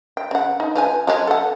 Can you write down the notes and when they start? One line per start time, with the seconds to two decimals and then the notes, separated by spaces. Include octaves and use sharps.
0.17 G5
0.31 C#3 F#5
0.60 D#4
0.75 F3 B4 G#5
1.07 F#3 G#3 C#4
1.27 A4 F#5